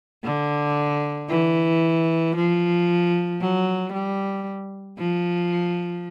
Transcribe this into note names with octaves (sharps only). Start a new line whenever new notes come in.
D3
E3
F3
F#3
G3
F3